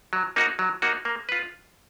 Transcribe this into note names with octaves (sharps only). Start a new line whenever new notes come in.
F#3
A#3 D#4 F#4
F#3
A#3 D#4 F#4
A#3
F4 B4